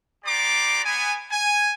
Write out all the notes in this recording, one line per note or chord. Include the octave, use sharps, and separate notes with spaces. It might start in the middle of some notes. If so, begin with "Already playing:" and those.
B3 G4 D5 A#5 C6 D6
B3 G#5
G#5